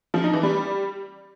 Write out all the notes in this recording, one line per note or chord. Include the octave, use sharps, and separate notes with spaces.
F3
D#4
E3
G3